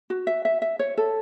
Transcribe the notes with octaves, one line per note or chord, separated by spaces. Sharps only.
F#4
E5
E5
E5
C#5
A4